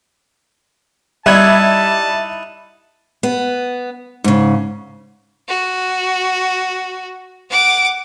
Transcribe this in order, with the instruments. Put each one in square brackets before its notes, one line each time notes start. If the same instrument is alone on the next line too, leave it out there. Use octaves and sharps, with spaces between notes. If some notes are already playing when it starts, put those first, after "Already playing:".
[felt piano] G3 [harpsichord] D#4 E4 F#5 [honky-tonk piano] E5 G#6 [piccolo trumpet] A5
[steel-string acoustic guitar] B3
G#2 C#3
[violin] F#4
F#5 D6